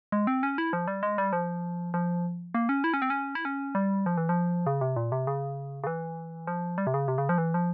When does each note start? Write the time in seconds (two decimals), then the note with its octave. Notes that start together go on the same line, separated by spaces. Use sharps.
0.12 G#3
0.27 C4
0.43 C#4
0.58 E4
0.73 F3
0.88 G3
1.03 G#3
1.18 G3
1.33 F3
1.94 F3
2.54 A#3
2.69 C#4
2.84 E4
2.94 C#4
3.02 C4
3.10 C#4
3.35 E4
3.45 C#4
3.75 G3
4.06 F3
4.17 E3
4.29 F3
4.66 C#3
4.81 C3
4.96 A#2
5.12 C3
5.27 C#3
5.84 C#3
5.87 E3
6.47 F3
6.78 G3
6.87 C3
6.94 C#3
7.08 C3
7.18 C#3
7.29 F3
7.38 E3
7.54 F3